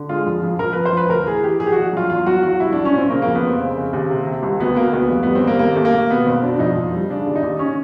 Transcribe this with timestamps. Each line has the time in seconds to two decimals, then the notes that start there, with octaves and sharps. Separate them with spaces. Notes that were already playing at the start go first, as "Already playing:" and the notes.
Already playing: D3
0.09 G#3 F4
0.27 F2
0.43 F2
0.59 F2 A#4
0.73 F2 B4
0.85 C5
0.93 F3 B4
1.09 D2 A#4
1.27 E3 G#4
1.43 E3 G4
1.60 A#1 G#4
1.66 G4
1.72 A#1 F#4
1.93 F#3 F4
2.10 E2 F4
2.26 F#3 F#4
2.43 E2 F#4
2.60 C2 E4
2.73 F#3 D4
2.85 C#4
2.93 A#2 C4
3.10 C#3 A#3
3.22 F2 A#3
3.35 B3
3.43 F1 C4
3.60 C#3
3.77 C#3
3.93 D#2
4.10 C3
4.27 C3
4.43 C2
4.60 D2 B3
4.76 D2 A#3
4.93 D2 B3
5.10 F1
5.23 G3 B3
5.35 C4
5.43 D#2 A#3
5.59 D#2 A#3
5.75 D#2 A3
5.85 A#3
5.93 D#2
6.10 B2 B3
6.26 F#1 C4
6.43 B2 D4
6.59 F2 D#4
6.77 F2
6.93 G3
7.10 C#3 D4
7.27 D#2
7.35 D#4
7.43 D#2
7.59 C#4